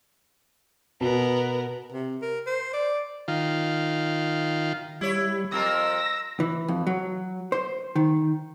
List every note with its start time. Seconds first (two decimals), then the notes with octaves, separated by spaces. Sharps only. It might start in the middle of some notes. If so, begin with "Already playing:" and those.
1.01 B2 B3 A#4
1.92 C3
2.22 A#4
2.46 C5
2.73 D5
3.28 D#3 F4
5.01 G3 E4 C#5
5.52 F2 F4 A#4 E6 A#6
6.40 E3
6.68 F2
6.87 F#3
7.52 C5
7.96 D#3